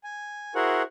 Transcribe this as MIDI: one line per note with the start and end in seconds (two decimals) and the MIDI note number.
0.04 0.54 80
0.55 0.82 64
0.55 0.82 66
0.55 0.82 68
0.55 0.82 70
0.55 0.82 72
0.55 0.82 78